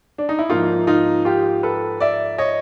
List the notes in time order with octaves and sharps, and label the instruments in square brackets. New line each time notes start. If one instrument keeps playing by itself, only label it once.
[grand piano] D4
D#4
E4
G#2 F3 A#3 D#4 F4
D#4 F4
F4 G4
A4 B4
D5 E5
C#5 D#5